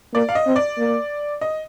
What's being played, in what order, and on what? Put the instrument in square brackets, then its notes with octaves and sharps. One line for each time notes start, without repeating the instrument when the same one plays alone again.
[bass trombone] A#3 [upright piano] D5
[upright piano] F5
D#5
[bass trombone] C4
[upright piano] D5
[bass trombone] A#3
[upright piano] D#5